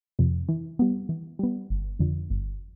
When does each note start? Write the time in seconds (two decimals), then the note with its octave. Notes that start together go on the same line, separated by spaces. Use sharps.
0.19 F2 C3
0.48 E3
0.79 G3 B3
1.09 E3
1.39 G3 B3
1.70 G1
1.99 F2 D3 F3
2.30 G1